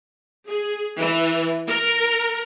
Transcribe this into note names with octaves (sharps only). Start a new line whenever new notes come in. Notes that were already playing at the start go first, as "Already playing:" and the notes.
G#4
E3
A#4